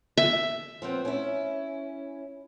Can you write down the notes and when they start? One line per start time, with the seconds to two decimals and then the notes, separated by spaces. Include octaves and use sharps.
0.17 E5
0.82 F3 B3 C4
1.05 C#4 E4